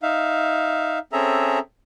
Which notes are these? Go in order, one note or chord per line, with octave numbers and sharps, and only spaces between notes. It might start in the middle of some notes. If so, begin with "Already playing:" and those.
D#4 E5 F5
C4 C#4 G#4 A4 E5 A#5